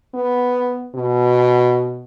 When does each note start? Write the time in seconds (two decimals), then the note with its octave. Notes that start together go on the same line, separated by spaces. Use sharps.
0.15 B3
0.95 B2